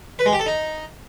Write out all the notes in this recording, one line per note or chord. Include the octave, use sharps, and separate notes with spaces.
B4
G#3
G4
A4
D#4